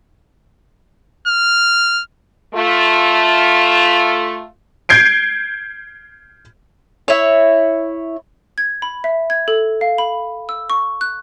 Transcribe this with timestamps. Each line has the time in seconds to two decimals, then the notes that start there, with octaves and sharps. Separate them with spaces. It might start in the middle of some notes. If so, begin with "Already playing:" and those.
1.28 F6
2.55 A3 F4
4.89 G6 G#6 C7 D7
7.08 E4 C#5
8.58 G#6
8.82 B5
9.04 E5
9.30 G#6
9.48 A4
9.81 F5
9.98 B5
10.49 E6
10.70 C#6
11.01 F#6